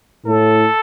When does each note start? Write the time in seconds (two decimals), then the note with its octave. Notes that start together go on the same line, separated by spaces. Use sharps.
0.26 A2 A4